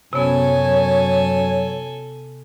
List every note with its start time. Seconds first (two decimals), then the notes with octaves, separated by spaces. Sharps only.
0.13 F#2 C3 B3 A4 C#5 G#5